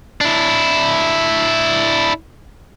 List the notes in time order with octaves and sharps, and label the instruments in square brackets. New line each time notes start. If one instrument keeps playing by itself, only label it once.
[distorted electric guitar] D4 E4